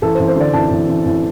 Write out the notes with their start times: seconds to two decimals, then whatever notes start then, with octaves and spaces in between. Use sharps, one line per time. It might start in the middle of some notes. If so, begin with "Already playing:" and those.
0.02 A1 A4
0.15 C5
0.19 A1
0.28 C5
0.36 D3 D5
0.53 A1 A5
0.71 A1
0.88 A1
1.05 A1